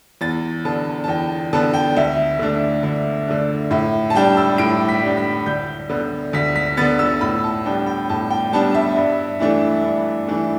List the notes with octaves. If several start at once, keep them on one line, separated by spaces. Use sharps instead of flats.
E2 A6
D3 B3 A5
A5
E2 G5
D3 B3 A5
G5
D2 E5
D3 A3 D4
D2
D3 A3 D4
A2 E5
A5
G3 D4 G5
E6
A2 D7
B6
G3 D4
B6
D2 G6
D3 B3
D2 B6
B6
D3 B3 A6
E6
A2 B5
A5
G3 B3 D4 G5
G5
A2 A5
G5
G3 B3 D4 A5
E5
G2
E3 A3 D4
G2
E3 A3 D4